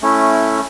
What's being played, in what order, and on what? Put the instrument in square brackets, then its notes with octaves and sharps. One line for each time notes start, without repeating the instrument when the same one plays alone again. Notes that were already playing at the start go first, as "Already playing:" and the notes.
[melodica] A3 C#4 E4